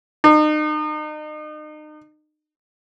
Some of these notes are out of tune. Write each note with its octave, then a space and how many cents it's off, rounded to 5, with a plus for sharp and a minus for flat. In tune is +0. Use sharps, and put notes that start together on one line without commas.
D#4 -35